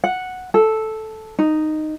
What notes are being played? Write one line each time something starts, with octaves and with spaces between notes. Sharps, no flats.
F#5
A4
D#4